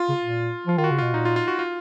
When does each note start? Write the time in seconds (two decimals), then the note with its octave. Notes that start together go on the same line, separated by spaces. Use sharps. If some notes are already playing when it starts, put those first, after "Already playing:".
Already playing: F4
0.09 C#3
0.24 A#2
0.67 F3 F4
0.78 D#3 F4
0.84 F#4
0.91 C#3
0.99 B2 F4
1.14 A#2 D#4
1.25 F4
1.36 F4
1.48 F#4
1.59 F4